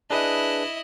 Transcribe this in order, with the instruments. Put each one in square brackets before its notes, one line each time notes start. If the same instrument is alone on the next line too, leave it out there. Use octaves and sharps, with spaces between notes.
[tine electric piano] D4 G#4 B4 [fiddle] E4 D#5